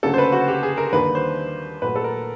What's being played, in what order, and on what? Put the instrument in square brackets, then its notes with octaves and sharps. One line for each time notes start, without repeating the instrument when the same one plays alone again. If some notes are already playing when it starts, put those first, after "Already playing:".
[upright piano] D2 C#3 F#3 A#3 A4
C5
B4
F#4
G4
G#4
A#4
D#2 D3 G3 A#3 B4
C5
A#2 F#3 A3 B4
A4
A#4